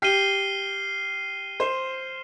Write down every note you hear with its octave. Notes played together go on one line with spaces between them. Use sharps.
G4 F6 C7 D#7 G7
C5